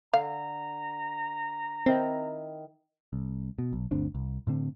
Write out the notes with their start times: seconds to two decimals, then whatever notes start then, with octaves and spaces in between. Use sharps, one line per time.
0.13 D3 F5 A#5
1.86 D#3 C4 E4
3.13 C2
3.58 B2
3.73 B1
3.91 G1 D2 C4 D4
4.15 C2
4.47 A2 D3 C4